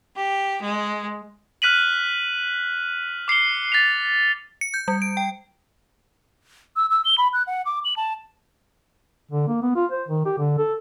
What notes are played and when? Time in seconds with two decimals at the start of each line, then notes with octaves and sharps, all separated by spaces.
0.16 G4
0.61 G#3
1.62 F6 F#6 B6 D#7 F#7
3.28 D6 C7 C#7 G7
3.72 A6 B6 C7 F7
4.61 C#7
4.74 G6
4.88 G3
5.02 D7
5.17 G5
6.76 E6
6.90 E6
7.05 G7
7.18 B5
7.33 F#6
7.47 F#5
7.66 D6
7.85 F#7
7.97 A5
9.31 D3
9.47 A#3
9.62 B3
9.75 F4
9.92 C5
10.08 D#3
10.25 G4
10.38 D3
10.58 A4